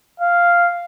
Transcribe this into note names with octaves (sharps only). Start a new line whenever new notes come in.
F5